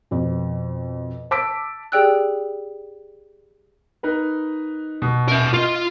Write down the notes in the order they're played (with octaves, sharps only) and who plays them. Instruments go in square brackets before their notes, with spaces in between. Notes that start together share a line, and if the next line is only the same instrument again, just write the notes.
[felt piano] F2 B2
A5 D6 E6 B6 D7
[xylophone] G4 G#4 D5 G5 E6 F#6
[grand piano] D#4 A#4 B4
B2
[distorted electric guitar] A#4 E5
[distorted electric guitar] F4 [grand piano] D#5 C6